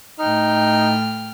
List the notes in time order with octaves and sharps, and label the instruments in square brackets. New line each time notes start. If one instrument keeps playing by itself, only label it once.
[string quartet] A2 G5 F6 [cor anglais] D#4